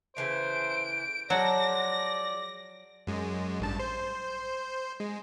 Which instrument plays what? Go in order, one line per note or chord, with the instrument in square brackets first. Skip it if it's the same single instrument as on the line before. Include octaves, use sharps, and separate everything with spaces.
[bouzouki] C#3 E3 A3 [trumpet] C5 [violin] D7
[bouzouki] F3 G#3 [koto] F#3 F#4 [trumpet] D5 [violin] A#6
[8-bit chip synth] F#2 G#3
A1 G2 A5
C5
G#3